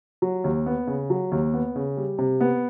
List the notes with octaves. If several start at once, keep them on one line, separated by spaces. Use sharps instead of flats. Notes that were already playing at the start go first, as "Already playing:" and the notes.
F#3
D#2
B3
C#3
F#3
D#2
B3
C#3
G3
C3
B3